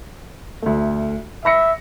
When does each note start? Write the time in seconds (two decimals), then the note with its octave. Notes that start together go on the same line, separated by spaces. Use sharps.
0.62 D2 A3
1.45 E5 B5 A#6 C#7